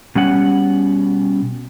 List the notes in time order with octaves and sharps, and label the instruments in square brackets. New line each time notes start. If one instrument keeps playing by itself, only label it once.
[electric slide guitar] B2 G3 C#4 F#5